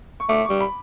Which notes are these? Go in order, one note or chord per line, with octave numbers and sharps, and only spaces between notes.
C#6
A3 D6
G3 C#6
B5